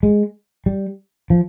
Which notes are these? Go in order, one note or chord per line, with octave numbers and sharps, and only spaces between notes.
G#3
G3
F3